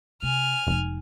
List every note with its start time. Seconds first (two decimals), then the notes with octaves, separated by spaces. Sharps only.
0.23 C3 G#5 F6
0.67 F1 G#3 D#4